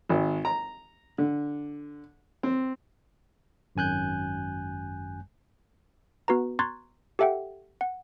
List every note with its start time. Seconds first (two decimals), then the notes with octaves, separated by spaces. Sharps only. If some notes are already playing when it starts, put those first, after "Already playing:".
0.09 G#1
0.45 A#5
1.18 D3
2.43 C4
3.76 G#1 F#2 G#5 F#6 G6
6.28 B3 F#4 B4 A#5
6.59 A#5 C6 C#6 F#6 G#6 A6
7.19 G4 A4 E5 F#5 G5
7.81 F#5